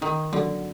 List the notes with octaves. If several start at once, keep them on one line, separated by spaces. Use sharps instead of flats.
D#3 D#4
D3 F#3